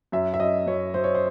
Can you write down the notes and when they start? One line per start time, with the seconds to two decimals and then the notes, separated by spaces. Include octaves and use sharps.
0.12 F#2 E5
0.34 E5
0.39 F#2 D#5
0.67 F#2 C#5
0.94 F#3 C5
1.04 C#5
1.15 C5